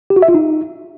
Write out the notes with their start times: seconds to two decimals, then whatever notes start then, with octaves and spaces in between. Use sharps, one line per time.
0.10 G4
0.16 F#4
0.22 E5
0.28 F4
0.34 D#4